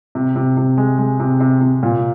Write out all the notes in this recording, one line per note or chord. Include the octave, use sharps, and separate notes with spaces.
C3
C3
C3
G#3
G#3
C3
C3
C3
A#2